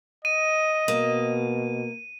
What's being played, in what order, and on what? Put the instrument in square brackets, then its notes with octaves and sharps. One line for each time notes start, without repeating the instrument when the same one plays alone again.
[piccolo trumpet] D#5 [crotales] D#7
[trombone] B2 [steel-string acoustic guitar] A#3